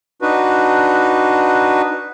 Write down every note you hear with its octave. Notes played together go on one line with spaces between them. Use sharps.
D4 D#4 F#4 B4